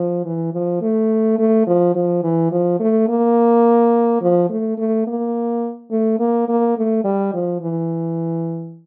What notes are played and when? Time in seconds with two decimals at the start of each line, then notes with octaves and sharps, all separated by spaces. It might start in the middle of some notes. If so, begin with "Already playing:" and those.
Already playing: F3
0.25 E3
0.53 F3
0.81 A3
1.38 A3
1.67 F3
1.95 F3
2.23 E3
2.51 F3
2.79 A3
3.08 A#3
4.21 F3
4.49 A3
4.77 A3
5.07 A#3
5.91 A3
6.19 A#3
6.48 A#3
6.77 A3
7.04 G3
7.33 F3
7.61 E3